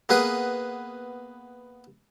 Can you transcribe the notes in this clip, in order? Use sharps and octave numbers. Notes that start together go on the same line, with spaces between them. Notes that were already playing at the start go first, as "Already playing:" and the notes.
A#3 B3 G#4 B4